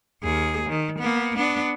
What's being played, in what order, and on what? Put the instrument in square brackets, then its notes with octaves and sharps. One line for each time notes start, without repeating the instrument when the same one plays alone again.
[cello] D#2 G#4
D#3
A#3 B3
B3 D4